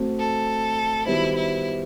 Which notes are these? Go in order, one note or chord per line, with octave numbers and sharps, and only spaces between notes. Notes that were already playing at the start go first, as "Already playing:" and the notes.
Already playing: A3 C4 F#4 C5
A4
D#3 G3 B3 E4 F#4 C5
E4